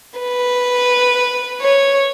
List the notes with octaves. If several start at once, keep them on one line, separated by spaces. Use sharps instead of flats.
B4
C#5